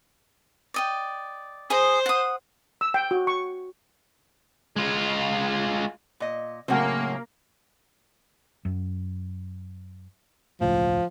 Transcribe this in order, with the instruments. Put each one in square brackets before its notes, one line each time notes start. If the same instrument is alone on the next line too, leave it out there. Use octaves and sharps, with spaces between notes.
[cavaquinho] D5 D#5 G5
[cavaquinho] G#4 D#5 D#6 [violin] C5
[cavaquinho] F#5 D#6
[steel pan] E6
G5
F#4
C#6
[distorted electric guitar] G#3 F4
[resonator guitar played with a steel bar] A#2 D#5
[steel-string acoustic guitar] A2 C#3 F#3 [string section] A#3 [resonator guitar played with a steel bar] C4 F#5
[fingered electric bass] F#2
[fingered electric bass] E1 C#2 A2 [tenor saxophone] F3